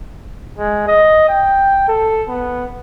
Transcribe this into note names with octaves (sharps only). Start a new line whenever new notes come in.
G#3
D#5
G5
A4
B3